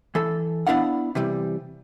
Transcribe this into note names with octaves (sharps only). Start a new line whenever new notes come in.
E3 A4
B3 D4 E4 D5 F5 F#5
C3 E3 G3